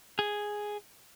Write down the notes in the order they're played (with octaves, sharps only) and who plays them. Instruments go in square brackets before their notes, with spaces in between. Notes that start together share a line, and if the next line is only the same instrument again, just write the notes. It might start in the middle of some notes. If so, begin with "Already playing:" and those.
[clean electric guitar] G#4